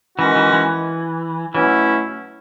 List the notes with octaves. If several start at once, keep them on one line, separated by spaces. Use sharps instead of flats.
D#3 E3 G#3 C#4 F#4
E3
E3
B2 E3 F#3 A3 C#4 E4